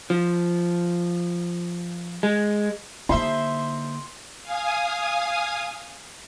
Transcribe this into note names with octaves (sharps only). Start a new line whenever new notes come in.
F3
G#3
D3 A#3 D#4 C5 E5 C6
F5 G#5 D#6